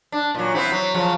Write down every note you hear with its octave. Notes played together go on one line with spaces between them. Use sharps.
D4
A#2 F#3
B3 C4 E4
F#3
C#3 F3 F#3